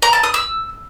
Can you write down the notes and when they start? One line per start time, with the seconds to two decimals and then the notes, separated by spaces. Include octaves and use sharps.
0.02 A#5
0.13 A5
0.23 D#6
0.34 E6